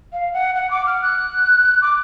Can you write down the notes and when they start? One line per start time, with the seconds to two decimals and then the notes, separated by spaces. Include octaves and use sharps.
0.12 F5
0.33 F#5
0.55 F#5
0.70 D6
0.86 F6
1.02 F#6
1.81 D6